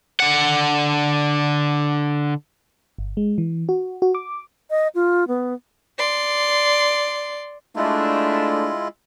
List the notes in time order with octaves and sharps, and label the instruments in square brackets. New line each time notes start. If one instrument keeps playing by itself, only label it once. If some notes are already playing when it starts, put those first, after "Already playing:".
[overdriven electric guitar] D3 F#5
[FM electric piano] G1
G#3
E3
F#4
F#4
D6
[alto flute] D#5
F4
B3
[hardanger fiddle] D5 C6
[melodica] G#3 E4 F4 [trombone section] A3 D4